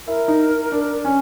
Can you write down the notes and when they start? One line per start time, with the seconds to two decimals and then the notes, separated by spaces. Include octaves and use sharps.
0.07 E4 A#4
0.28 D#4
0.72 D4
1.05 C#4